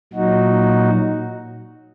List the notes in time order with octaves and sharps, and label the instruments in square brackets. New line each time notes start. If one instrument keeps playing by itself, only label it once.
[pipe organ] A#2 F#3 D#4 F#4